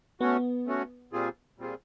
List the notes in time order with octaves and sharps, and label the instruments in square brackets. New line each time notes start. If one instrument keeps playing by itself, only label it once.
[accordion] A3 C#4 F#4 [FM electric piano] B3
[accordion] A3 C#4 F#4
A#2 G3 C4 F4 G#4
A#2 G3 C4 F4 G#4